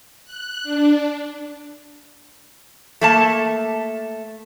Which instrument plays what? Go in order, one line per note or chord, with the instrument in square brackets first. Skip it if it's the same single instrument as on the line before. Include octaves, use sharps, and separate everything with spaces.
[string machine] F#6
D4
[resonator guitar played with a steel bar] A3 A#3 A5